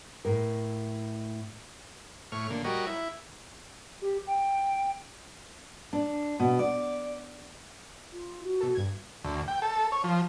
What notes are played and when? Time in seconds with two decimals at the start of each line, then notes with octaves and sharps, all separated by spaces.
0.25 A2 A#4
2.32 A2 C#5 F6
2.50 A#2 D3
2.64 G3 F#4 A#4 C#5 D#5
2.86 E4
4.02 G4
4.27 G5
5.93 D4
6.40 B2
6.59 D5
8.12 F4
8.44 F#4
8.61 B2 A4
8.75 G2 G#6
9.24 D2
9.48 G5
9.62 A4
9.92 C#5
10.04 F3